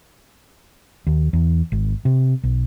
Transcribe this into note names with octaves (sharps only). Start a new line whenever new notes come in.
D#2
E2
G#1
C3
B1